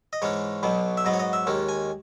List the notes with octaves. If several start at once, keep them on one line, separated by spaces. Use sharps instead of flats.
D#5
G#2 E3 G#3 C#4 C#5
B1 B2 F#3 B3
E5
G#2 F#3 B3 D#5
C#5
D#5
E5
D#2 D#3 G#3 C#4
G#5